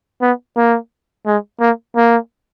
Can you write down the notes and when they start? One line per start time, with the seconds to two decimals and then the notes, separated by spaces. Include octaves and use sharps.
0.22 B3
0.57 A#3
1.26 G#3
1.60 A#3
1.96 A#3